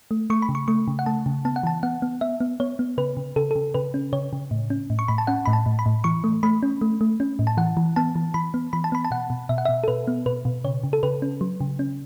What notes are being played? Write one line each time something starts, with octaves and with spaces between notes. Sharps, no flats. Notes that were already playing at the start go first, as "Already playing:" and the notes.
A3
A3 C#6
B5
C#3
C#6
A3 C#6
C#3
F#5
A3 A5
C#3
B3 A5
F#5
E3 A5
B3 F#5
B3
B3 E5
B3
B3 C#5
B3
C#3 B4
C#3
C#3 A4
C#3 A4
C#3 B4
C#4
C#3 C#5
C#3
A2
C#4
A2
C#6
A2 B5
A5
C#4 F#5
A2 B5
A5
A2
B5
A2
E3 C#6
A3
A3 B5
C#4
A3
A3
C#4
A2
A5
E3 F#5
E3
B3 A5
E3
E3 B5
B3
E3 B5
A5
B3 B5
A5
B2 F#5
B2
B2 E5
F#5
B2 E5
A4
B2 B4
B3
B2 B4
B2
C#3 C#5
C#3
A4
C#3 B4
C#4
F#3
C#3
C#4